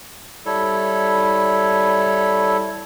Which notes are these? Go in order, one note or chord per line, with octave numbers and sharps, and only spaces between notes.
G3 E4 A4 C#5